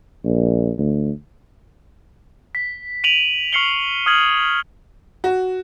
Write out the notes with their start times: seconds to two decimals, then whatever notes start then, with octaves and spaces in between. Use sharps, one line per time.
0.25 A#1
0.78 D2
2.55 B6
3.04 D7 D#7 F7 F#7
3.53 C#6 F6 C7 C#7 F#7 G7
4.06 D#6 F6 G#6 F#7
5.24 F#4